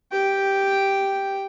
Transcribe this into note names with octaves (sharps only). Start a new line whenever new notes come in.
G4 G5